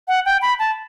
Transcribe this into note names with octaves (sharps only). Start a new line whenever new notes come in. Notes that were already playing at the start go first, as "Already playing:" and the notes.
F#5
G5
B5
A5